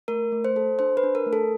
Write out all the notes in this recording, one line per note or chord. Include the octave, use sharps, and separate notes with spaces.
A3 A#4
A3
C5
A4
D4 C5
B4
D4
A#4
A3
A4